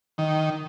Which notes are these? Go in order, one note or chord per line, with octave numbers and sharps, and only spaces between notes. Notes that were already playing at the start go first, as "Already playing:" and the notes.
D#3